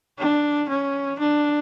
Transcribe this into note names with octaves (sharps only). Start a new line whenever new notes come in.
D4
C#4
D4